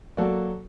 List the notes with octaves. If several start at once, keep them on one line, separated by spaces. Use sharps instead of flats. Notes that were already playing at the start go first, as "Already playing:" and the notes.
F#3 A#3 F#4 A4 D5